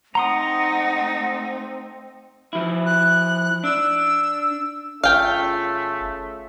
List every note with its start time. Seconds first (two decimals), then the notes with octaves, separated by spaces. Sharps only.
0.15 A3 C4 D#4 F#5 A#5 C6 D#6
2.53 F3 E4
2.86 F#6
3.64 D4 E6
5.04 G1 A3 C#4 F4 G#4 F5 G5